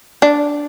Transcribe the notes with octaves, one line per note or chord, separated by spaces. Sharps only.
D4